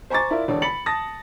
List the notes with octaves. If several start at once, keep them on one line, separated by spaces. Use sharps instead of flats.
C5 G#5 A#5 C#6 D6 A6
E4 F4 A#4 D5 E5
E1 D3 C#5 D5
B5 A6 C#7 F#7
A5 D#6 A6 A#6